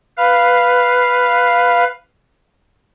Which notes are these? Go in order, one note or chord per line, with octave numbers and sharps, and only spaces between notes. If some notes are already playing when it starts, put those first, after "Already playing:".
B4 F5